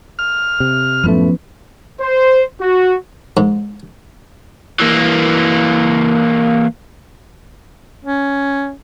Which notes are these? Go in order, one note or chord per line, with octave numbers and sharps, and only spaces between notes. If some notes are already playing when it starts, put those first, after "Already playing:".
F6
C3
F#2 A2 F3 A3 B3 C#4 B4
C5
F#4
G#2
E3 A#3
C#4